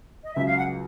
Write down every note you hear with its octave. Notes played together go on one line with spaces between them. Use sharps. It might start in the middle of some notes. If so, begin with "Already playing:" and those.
D#5
C#2 C#3 F#3 E5
F5
F#5